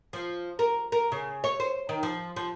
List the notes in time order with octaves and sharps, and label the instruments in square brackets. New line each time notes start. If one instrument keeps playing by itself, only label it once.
[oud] F3
A#4
A#4
C#3
C#5
C5
D#3
F3
F3